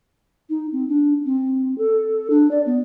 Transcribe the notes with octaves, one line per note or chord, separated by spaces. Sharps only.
D#4
C4
D4
C4
A4
D4
D5
B3